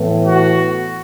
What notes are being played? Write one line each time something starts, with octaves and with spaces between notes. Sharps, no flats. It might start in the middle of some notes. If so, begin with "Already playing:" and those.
Already playing: A2 E3 B3
F#4